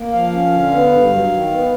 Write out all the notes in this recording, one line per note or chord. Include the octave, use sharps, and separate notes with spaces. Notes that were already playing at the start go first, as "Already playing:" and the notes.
Already playing: A#3
F3 F5
C#4
D3
B3
G2
F#3
D#3
B3